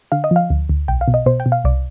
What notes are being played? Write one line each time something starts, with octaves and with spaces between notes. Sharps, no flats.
D3 F5
D#5
F3
F5
D2
D2
B1 G5
F5
B2
D#5
B2 C5
G5
B2
F5
C2 D5